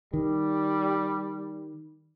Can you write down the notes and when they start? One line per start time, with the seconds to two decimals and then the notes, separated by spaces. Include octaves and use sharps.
0.13 D#3 G3